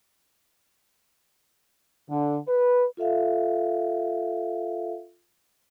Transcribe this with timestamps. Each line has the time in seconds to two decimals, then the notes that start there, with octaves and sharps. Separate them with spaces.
2.10 D3
2.48 B4
2.97 F4 A4 E5 F5